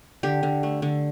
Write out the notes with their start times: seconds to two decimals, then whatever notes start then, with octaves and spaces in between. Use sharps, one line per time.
0.23 D3 G4
0.43 D3
0.63 A3
0.82 D3